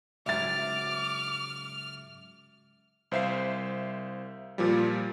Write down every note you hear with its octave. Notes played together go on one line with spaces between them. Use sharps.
C#2 G#2 F#3 E5 D6 F6 A6
C2 C5 E5 F5 C7
A#2 F3 G3